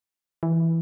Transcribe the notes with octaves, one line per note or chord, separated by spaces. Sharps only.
E3